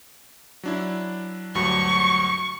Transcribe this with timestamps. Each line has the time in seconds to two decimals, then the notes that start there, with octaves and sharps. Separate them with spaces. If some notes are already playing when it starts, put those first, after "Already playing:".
0.63 F#3 D4 E4
1.55 D2 G2 F#3 C#6